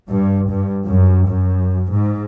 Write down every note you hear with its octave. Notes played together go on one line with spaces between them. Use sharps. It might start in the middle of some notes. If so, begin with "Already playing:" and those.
G2
G2
F#2
F#2
G#2